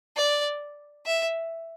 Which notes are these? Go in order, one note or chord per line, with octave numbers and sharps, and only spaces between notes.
D5
E5